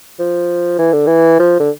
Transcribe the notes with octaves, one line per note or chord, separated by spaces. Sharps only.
F3
E3
D3
E3
F3
D3